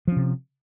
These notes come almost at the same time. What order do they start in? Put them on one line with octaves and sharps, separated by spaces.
F3 C#4 C3